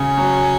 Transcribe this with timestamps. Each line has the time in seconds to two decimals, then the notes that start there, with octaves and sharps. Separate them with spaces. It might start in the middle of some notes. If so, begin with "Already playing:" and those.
Already playing: C#3 C#4
0.17 F#3